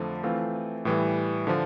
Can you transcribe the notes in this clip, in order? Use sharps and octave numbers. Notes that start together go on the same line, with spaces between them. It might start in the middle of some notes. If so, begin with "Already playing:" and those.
Already playing: F2 D3 F3 A3
E3 A3 C4 F4
A2 E3 G3
D3 F3